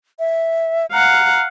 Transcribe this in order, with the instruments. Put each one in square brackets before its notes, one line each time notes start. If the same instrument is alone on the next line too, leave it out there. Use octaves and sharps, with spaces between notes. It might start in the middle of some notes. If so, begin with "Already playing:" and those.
[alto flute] E5
[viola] F5 F#5 [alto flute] A#5